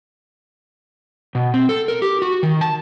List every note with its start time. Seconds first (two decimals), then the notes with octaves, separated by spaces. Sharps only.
1.35 B2
1.54 C4
1.69 A4
1.88 A#4
2.02 G4
2.22 F#4
2.43 D#3
2.61 A5